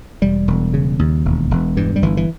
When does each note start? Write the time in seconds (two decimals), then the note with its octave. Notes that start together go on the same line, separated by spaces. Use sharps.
0.22 E1 G3
0.48 E1
0.74 C#3
0.99 D#2
1.25 E1
1.51 E1
1.77 G2 E3
1.96 G3
2.02 G1 E3
2.17 E3